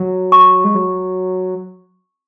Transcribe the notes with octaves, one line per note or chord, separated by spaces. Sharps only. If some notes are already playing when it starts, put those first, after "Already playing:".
Already playing: F#3
C#6
G#3
F#3